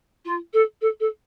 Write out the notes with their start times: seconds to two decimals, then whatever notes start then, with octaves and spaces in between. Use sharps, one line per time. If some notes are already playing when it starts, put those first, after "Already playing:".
0.25 F4
0.53 A4
0.81 A4
1.00 A4